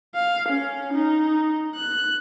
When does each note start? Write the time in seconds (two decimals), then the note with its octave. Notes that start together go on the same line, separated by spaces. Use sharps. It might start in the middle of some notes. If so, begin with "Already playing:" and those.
0.15 F5
0.48 C#4
0.93 D#4
1.75 F#6